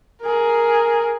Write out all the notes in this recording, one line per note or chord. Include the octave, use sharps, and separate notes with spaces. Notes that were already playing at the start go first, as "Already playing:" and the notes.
G#4 A#4